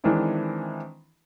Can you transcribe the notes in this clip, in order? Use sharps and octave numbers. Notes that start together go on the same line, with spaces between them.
D#3 E3 G#3 C4 D4 E4